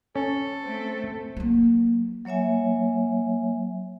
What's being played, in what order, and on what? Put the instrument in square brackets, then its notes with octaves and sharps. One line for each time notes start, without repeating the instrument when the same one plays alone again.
[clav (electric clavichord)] C#4 [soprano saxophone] A4
[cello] A3 C4
[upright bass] F#3 A#3
[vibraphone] F#3 A#3 C#5 E5 G#5